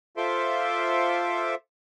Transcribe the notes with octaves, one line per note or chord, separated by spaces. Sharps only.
F4 A4 C5 E5 C6 D6